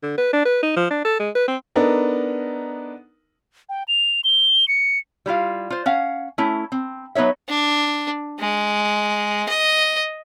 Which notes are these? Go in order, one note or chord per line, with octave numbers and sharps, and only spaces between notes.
D3
B4
D4
B4
D#4
F3
D4
A4
G#3
B4
C4
B3 D4 D#4 A4 A#4
G5
F7
G7
C#7
G3 E4 F4 F5
F4 C5
C#4 F5 F#5
A3 C#4 E4
C4
F#3 B3 D#4 C#5 E5
D4
G#3
D#5